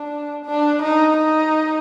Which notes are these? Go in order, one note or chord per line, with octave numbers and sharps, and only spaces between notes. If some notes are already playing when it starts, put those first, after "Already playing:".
Already playing: D4
D4
D#4
D#4